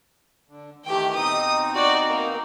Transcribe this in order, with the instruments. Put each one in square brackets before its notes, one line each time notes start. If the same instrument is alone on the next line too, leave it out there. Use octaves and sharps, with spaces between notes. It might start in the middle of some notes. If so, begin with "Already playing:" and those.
[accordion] D3
[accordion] D#3 E3 A3 [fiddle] G4 G5
[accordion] B2 C4 D#4 [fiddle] D#6
[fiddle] F#4 D5
A#3